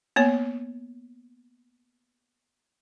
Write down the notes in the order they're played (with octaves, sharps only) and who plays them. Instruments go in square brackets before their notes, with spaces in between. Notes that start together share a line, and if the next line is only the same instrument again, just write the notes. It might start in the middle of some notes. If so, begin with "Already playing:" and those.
[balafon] A#3 B3 C#5